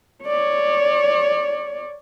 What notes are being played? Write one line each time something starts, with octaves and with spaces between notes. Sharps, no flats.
C#5 D5